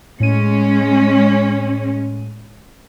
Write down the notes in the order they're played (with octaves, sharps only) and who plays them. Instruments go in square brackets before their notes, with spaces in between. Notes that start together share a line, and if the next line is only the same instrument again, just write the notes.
[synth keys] A2 D#7 [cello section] G#3 C#4